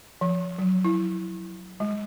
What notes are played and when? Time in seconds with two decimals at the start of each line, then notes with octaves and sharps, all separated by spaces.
0.21 F3
0.58 F#3
0.85 E4
1.80 G#3